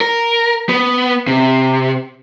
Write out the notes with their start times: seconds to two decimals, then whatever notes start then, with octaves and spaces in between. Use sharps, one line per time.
0.01 A#4
0.69 B3
1.27 C3